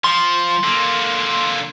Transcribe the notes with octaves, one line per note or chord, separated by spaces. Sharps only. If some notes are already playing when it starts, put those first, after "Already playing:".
F3 C6
D3 A#3